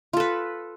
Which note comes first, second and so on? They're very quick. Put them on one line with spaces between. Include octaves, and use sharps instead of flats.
F4 A4 B4